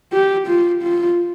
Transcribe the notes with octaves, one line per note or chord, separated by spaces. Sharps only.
G4
F4
F4